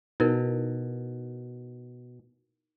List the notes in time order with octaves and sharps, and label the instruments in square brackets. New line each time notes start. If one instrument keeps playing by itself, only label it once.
[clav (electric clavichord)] B2 [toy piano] D#4 E4 A#4